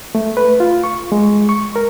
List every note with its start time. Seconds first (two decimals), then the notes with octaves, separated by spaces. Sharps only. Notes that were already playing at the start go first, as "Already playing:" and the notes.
0.15 A3
0.37 B4
0.60 F4
0.84 C#6
1.12 G#3
1.49 C#6
1.76 A#4